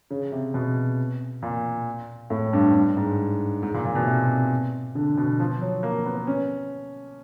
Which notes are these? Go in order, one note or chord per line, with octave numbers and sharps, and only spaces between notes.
C#3
C3
B2
A#2
A2
G2
G2
G#2
G#2
A#2
A#2
B2
C3
D3
B2
F3
F#3
A#3
B3
C#4